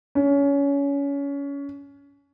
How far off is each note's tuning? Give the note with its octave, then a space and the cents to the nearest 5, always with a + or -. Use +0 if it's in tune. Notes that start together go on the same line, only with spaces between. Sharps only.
C#4 +25